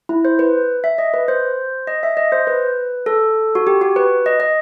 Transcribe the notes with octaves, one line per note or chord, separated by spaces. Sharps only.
E4
C5
B4
E5
D#5
B4
C5
D#5
E5
D#5
C5
B4
A4
F#4
G4
F#4
B4
D#5
D#5